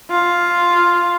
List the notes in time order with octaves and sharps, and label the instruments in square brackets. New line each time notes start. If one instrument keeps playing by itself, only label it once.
[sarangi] F4